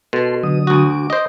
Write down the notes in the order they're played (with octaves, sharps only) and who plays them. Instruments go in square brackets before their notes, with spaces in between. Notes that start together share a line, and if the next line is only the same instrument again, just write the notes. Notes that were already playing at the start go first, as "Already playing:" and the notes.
[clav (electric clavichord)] B2 [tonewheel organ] A4 C6
[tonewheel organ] D3 F#3 D#6
[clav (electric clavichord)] D2 F#4
[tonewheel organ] D6
[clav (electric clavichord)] C5 D#5